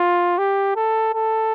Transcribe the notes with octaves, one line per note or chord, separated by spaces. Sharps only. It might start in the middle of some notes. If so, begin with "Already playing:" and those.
Already playing: F4
G4
A4
A4